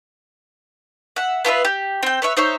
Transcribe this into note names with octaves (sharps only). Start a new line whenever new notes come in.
E5 F#5
B3 F4 B4 E5
G4
C4 G5
B4 C#5 E5
D#4 C5 C#5 E5